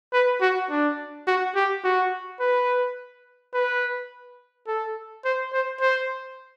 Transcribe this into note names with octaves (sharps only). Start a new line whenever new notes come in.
B4
F#4
D4
F#4
G4
F#4
B4
B4
A4
C5
C5
C5